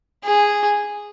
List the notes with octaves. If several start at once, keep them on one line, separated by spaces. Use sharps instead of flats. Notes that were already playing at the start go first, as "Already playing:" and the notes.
G#4